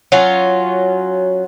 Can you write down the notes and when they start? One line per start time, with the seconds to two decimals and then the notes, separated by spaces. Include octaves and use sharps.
0.12 F#3 C#4 F4